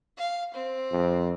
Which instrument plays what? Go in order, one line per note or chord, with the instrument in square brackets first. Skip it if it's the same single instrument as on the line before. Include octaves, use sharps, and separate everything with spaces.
[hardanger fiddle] F5
C4
[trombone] F2